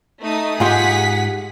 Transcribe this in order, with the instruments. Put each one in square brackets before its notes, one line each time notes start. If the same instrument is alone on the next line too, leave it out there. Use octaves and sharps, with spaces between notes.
[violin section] A3 D#4 D#6
[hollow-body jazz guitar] G#2 F4 G4 [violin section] G#4 F#5 B6